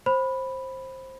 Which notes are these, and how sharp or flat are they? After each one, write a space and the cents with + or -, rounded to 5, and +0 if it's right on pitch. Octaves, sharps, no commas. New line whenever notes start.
C5 +15 B5 +0